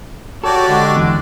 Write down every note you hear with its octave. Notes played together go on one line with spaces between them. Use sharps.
F#4 G4 A4 C#5 D5
D3 G#3 D4
E2